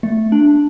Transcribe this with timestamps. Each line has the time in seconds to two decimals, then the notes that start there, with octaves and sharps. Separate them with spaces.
0.03 A3
0.32 D4